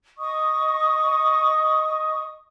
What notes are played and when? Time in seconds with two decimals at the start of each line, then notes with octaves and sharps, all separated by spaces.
0.18 D#5 C#6 D#6